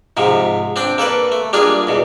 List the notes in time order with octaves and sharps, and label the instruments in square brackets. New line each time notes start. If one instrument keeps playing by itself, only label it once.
[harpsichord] G#2 C3 F3
C4 D4 D5 G5
A#3 A4 B4 D5
A3
G3 A#3 D4 F4 G#4
E2 B2